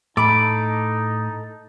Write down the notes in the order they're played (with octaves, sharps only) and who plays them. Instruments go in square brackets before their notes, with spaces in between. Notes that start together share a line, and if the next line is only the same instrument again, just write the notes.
[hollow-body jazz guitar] A2 [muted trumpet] D#4 [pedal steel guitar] A4 B5 [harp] D6